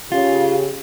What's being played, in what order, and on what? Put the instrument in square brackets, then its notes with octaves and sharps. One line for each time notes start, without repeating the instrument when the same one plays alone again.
[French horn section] C#3 G4 [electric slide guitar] F4